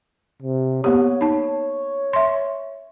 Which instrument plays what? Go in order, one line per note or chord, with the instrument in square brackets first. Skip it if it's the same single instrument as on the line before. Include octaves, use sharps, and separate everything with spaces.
[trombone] C3
[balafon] A#3 B3 G4 [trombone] C#5
[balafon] D#4 A5
E5 C6